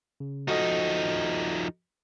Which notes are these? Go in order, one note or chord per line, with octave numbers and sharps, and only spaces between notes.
C#3
F3 D#4 F#4 A4 D#5